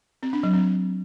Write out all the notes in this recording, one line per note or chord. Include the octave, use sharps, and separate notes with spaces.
C4
D4
F#3
C4